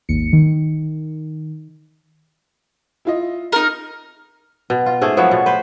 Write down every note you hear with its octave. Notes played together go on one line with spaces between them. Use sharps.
G#1 D#2 C#7
D#3
E4 F4 D#5
D#4 A#4
B2
F4
G#2 A3 G#4
F3 F#3 B3 C#5
B2
B4 C5